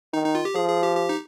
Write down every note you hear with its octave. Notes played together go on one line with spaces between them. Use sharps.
D#3 D#4
D#4
F4
G4
F3 G#4
G#4
G4
G4
D#4